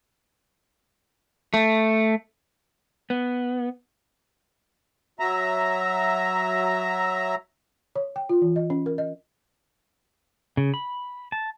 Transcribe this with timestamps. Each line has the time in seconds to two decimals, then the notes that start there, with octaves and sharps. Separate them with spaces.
1.54 A3
3.10 B3
5.19 F#3 E5 A#5
7.96 C#5
8.16 G5
8.29 F4
8.42 E3
8.56 D#5
8.70 C#4
8.86 A#4
8.98 D#5
10.57 C#3
10.74 B5
11.32 A5